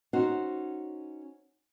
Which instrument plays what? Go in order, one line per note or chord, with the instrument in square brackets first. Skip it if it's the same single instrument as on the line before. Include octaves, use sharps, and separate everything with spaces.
[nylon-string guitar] C#4 D#4 F#4 C5